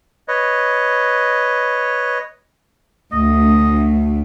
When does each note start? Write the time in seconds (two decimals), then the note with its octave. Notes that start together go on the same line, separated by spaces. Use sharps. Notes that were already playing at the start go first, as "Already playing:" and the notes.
0.28 B4 C#5 D#5
3.13 D2 D#5